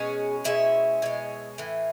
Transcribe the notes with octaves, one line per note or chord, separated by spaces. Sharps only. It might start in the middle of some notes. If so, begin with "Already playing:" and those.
Already playing: B2 G#3 C#4 G#4
B2 G#3 C#4 E4 E5
B2 G#3 C#4
A2 E3